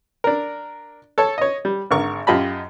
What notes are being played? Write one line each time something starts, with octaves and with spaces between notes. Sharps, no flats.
D4 A#4
A4 C#5 A5
C#5 D#5
G3
G#1 D3 A#4 C#6
F#2 F4 G4 D#5 A5 B5